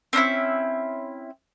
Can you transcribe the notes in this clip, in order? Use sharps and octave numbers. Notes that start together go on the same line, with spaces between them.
C4 C#4 D#4 E4